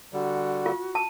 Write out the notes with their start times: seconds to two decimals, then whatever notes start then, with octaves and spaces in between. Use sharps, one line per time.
0.13 D3 G3 F#4
0.66 F4
0.95 A5